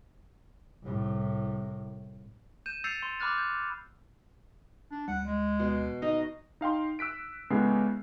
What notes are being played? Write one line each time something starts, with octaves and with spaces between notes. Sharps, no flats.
C2 A2
G6 D#7 E7
E6 G6 A6 C7 C#7 F7
C6
B5 D6 F6 F#6 A6
G6
D4
D2 G3 F#5
D2 G#3
B2
D#4 D#5
D#4 F5 G5 C6
E6 F#6 B6 D7
A2 C#3 G#3 B3 G4 C7